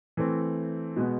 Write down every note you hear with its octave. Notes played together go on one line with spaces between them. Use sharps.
E3 A3 C4
B2 G#3 B3